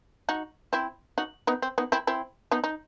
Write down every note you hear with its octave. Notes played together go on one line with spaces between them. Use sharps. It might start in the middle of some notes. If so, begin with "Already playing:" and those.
D#4 F#4
C4 E4
D#4 F#4
B3 D#4
C4
B3 D#4
C4 E4
C4 E4
B3 D#4
D#4